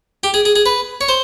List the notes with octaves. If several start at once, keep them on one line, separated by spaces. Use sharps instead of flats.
G4
G#4
G#4
G#4
B4
C#5
C5